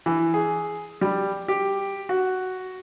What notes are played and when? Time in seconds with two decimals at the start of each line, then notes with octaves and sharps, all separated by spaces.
0.06 E3
0.34 G#4
1.01 G3
1.48 G4
2.09 F#4